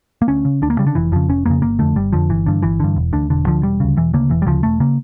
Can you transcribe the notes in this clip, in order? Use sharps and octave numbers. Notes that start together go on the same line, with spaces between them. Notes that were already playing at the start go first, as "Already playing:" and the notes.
A#3
D2 C#4
C#3
D2 D4
A#3
C#3 G3
D3
F1 E3
F2 C#3 F3
F1 C#4
F2 C#3 A#3
G1 A#3
F2 D3 A3
G1 G3
F2 D3 F3
G1 E3
G2 D3
G1 E3
G2 D3
E1
D2 D3
E1 D3
D2 D3 F3
E1 G3
D2 C#3
E1 E3
D2 C#3 A#3
E1 E3
G3
D2 C#3 F3
E1 A3
C#3 A#3